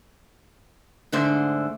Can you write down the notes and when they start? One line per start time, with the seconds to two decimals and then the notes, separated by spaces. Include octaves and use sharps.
1.12 G#2 D3 A3 C5